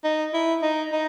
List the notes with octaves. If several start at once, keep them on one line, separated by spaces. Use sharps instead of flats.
D#4
E4
D#4
D#4